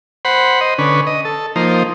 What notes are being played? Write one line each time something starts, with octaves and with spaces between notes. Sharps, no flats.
C5 F#5 B5
C5 D#5
D3 C#4 B4
D#5
A4
F3 A#3 D#4 C5